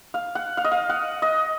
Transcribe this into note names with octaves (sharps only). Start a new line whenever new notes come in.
F5
F#5
F5
D#5
F5
F#5
D#5